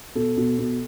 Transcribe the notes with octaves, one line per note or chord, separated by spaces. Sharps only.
B2 A4
B2
B2